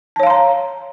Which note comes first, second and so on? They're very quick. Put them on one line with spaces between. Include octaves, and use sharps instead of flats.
A5 C#5 F5 C6 A#5